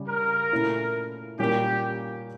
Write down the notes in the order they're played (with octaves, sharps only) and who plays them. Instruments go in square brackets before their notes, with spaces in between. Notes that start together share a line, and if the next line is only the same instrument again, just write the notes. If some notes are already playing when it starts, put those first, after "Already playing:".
Already playing: [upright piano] C#3 G3 C#4
[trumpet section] A#4
[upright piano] A#2 A3 C#4 E4
[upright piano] A#2 G3 A#3 C#4 [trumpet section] G4